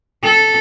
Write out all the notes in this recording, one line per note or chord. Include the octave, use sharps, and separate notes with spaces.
A4